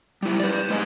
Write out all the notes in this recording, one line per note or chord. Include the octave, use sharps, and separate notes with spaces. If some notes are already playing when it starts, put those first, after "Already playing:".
G3 E4
B4 D5
G#3 C5 D#5 F5 G#5